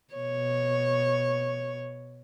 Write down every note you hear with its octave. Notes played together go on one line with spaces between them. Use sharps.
B2 C#5